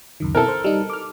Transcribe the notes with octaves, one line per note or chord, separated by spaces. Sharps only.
C#2 F#2 D#3
B2 C4 E4 A4 A#4
C5
G3 D#4
D6 F6